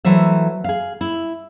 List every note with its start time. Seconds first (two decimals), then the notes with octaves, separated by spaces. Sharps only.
0.05 E3 F#3 A3 C5 E5
0.64 G#4 F5
1.01 E4